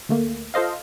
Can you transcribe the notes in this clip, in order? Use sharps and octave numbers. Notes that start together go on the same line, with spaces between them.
D2 A3 A#3
F4 A4 C5 D#5 F5